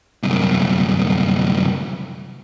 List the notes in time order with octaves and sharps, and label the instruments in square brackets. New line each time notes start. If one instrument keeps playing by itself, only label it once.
[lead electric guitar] C2 F#2